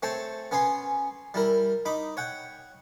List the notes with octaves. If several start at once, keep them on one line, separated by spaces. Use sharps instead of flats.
A3 C4 C#5 G5 A5
B3 C#4 C#5 G#5 C6
G3 E4 A#4
D#4 B5 D6
C#5 F#5 G5